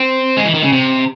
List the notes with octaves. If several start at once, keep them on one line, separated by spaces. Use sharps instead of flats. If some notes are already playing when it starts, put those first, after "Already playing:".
Already playing: C4
G#3
E3
D#3
C#3
C3